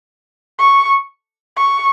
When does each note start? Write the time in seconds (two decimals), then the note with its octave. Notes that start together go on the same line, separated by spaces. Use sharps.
0.59 C#6
1.57 C#6